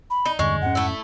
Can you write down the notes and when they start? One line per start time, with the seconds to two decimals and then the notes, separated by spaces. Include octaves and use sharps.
0.10 B5
0.25 D#4
0.39 E2 G2 D3 G#3 C#6
0.62 F2 G#2 C#4 F#5
0.75 A3 E4